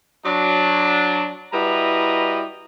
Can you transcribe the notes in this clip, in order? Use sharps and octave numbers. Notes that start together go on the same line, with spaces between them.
F#3 D4
G3 E4 F#4 B4 D#5 A#5